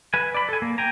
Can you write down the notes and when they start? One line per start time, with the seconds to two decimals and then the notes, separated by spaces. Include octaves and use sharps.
0.14 B4 G#5
0.34 D5 B5
0.49 A4 G#5
0.62 A#3
0.78 G5 G#5 A#5